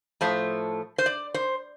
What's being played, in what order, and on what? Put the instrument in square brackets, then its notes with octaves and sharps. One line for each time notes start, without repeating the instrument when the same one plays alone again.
[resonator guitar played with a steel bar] A2 F3 A3 C5
C5
D5
C5